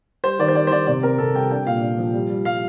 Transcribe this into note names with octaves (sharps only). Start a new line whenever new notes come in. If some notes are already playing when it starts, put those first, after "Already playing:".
G3 C5
D#3 D5
C5
G3 D5
C5
D#3 D5
C3 D5
C4 A#4
C3 A4
G3 G5
D4 G5
A#2 F5
D4
F3
G3
G3
G3 F5